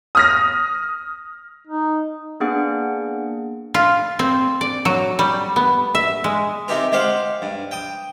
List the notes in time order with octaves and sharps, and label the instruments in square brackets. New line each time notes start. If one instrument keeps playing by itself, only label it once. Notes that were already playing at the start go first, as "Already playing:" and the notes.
[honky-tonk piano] D#6 F6 A#6
[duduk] D#4
[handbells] A#3 B3 D4 G#4 F#5
[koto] F4
C4
D5
F#3
G3
B3
E5
G#3
[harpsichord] C3 D#4 G4 A#4
G#3 G4 C5 F5 F#5
G2
G5 D#6